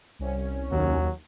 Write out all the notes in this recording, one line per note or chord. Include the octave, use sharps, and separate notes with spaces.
C2 C#4
D#2 F#3